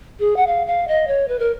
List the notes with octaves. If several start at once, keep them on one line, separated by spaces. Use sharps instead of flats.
G#4
F#5
F5
F5
D#5
C#5
B4
A#4